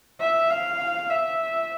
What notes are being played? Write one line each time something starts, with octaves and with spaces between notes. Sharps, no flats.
E5
F5
E5